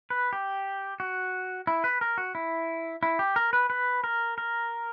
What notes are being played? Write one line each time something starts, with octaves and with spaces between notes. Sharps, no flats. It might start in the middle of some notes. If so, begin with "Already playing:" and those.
B4
G4
F#4
E4
B4
A#4
F#4
E4
E4
G4
A#4
B4
B4
A#4
A#4